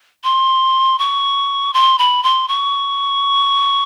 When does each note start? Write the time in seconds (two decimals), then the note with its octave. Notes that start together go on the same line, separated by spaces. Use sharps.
0.24 C6
0.99 C#6
1.74 C6
1.98 B5
2.23 C6
2.48 C#6